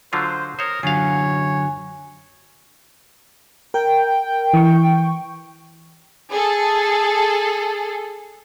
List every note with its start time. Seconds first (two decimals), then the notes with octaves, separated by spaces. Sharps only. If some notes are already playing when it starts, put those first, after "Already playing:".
0.13 D3 F#3 F4 C5
0.59 A#4 C5 C#5 D#6
0.83 F#2 D3 F#3 F4 C#5 F5 G#5
3.74 A#4 G5
4.54 E3 C#6
6.30 G#4 A4